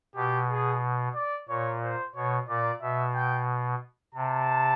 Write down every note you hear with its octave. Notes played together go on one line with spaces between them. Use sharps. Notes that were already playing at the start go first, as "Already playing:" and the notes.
B2 G4
G#4
D5
A#2 C#5
C5
B2 C#5
A#2 D5
B2 E5
G5
C3 A5